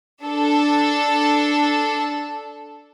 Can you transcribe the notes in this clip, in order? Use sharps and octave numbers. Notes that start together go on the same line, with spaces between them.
D4 A4